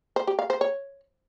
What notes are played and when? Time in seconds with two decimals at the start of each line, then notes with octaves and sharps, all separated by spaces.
0.16 C5
0.27 G4
0.39 F5
0.50 C5
0.61 C#5